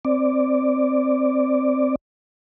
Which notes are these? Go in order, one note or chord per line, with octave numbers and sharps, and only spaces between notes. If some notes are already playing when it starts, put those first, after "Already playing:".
C4 D5